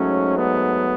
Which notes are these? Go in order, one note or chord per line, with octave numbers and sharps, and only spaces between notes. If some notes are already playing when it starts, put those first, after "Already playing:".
Already playing: G#2 F#3 A3 C#4
B3